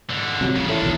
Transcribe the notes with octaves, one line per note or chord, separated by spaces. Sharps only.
G#2 D3
C3 F#3
A1 F2 C#3
A2 D#3 D4
B1 E2